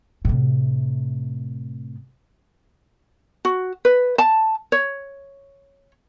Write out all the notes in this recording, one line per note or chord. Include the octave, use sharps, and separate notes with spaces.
A2 C3
F#4
B4
A5
C#5